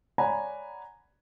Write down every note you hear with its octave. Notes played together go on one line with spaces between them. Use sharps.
C#5 D5 F#5 G#5 A#5 B5